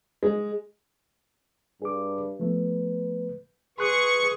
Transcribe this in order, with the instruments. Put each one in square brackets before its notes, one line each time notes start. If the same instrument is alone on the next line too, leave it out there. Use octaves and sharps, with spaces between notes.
[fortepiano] G#3
[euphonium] G2 [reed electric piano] G#4 D6
[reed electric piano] F3 A3 B3 [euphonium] B4
[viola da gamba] G#4 [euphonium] B4 [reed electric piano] C6 F#6 [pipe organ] C#6